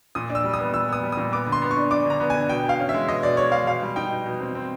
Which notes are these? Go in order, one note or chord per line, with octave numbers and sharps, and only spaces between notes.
A#2 D#6
D4
E6
G3
D#6
B3
A#2 E6
B3 D#6
G3
A#2 D#6
B3 D6
D3
C6
B3
C#6
D4
D4 D6
D3 A#5
B3
D3 G#5
B2 G5
B2 F5
C#4
E5
G#3
B2 D#5
B2 D5
G#3 C#5
G#3 F5
B2 F5
G3
D#4 G5
B2
B2
C4
C4